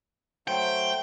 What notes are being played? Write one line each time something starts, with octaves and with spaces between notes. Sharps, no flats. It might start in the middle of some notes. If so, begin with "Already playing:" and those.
F#3 A3 C5 G5